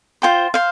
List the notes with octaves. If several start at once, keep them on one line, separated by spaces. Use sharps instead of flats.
F4 C5 G5 C6
C5 F5